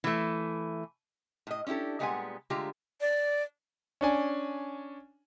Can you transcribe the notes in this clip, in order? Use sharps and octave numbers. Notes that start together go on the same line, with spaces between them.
E3 A3
A2 D#5
C#4 D4 E4 G4 A4
A#2 G3 G#3 B3 F#5 G#5
D3 G#3 A3 F4 G4 A#5
D5
C#4 D4 G#5